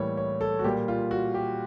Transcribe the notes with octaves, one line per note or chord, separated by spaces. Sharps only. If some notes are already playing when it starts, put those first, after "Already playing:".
Already playing: A2 E3 G3 A#3 C#5
C#5
A4
F#4
A#2 G3 A#3 G4
F4
F#4
G4